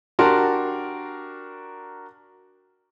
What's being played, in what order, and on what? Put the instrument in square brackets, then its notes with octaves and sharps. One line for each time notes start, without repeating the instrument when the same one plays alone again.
[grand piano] D4 F#4 G4 A#4 A5 C6